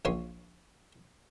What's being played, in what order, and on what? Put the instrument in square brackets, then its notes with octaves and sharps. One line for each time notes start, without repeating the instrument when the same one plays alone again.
[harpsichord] A#1 C#4 C#5 C6